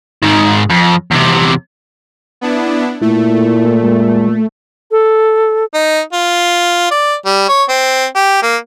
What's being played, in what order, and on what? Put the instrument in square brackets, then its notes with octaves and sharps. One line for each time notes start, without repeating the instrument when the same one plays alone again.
[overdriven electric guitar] G#2 D#3
F2
E2 C3
[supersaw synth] B3 D4 E4
[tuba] A#2 [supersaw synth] A3 [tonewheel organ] E4
[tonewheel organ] G#3
[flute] A4
[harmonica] D#4
F4
D5
G3
C#5
C4
G4
A#3